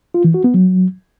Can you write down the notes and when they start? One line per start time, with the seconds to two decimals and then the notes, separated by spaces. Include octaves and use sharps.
0.14 F4
0.24 E3
0.34 F#4
0.44 B3
0.54 F#3